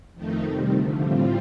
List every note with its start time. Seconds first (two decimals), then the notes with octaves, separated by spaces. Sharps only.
0.14 F2 D#3 A3 D#4
0.43 C3 D#3 G3
0.71 D3 F3 A3
0.99 A2 G3 C4 F4